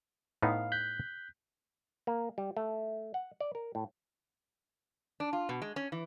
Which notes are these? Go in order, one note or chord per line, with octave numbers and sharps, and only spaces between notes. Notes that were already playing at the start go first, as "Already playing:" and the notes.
A2 B3 D#4 F5
F#6 G6 B6
A#3
G3
A3
F#5
D5
A#4
A2
D4
F4
B2
G#3
C#4
E3